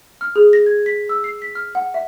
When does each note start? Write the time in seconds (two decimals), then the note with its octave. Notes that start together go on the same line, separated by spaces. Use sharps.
0.21 F6
0.36 G#4
0.53 A#6
0.66 G#6
0.86 B6
1.09 E6
1.24 C7
1.42 B6
1.55 F6
1.75 F#5
1.94 E5